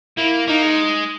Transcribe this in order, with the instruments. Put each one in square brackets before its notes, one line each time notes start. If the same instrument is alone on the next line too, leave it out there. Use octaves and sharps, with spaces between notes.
[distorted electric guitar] A#3 [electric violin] E4
[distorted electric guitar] A#3 [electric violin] D#4
[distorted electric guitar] G#3